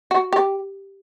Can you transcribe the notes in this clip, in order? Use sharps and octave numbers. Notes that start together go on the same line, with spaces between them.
F#4
G4